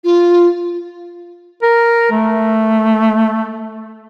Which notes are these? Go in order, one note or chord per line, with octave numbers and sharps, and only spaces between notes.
F4
A#4
A3